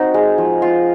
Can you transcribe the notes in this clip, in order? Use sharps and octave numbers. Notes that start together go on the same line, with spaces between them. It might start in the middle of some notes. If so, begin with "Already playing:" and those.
Already playing: C4 D#4 F#4
G#3
F3
F4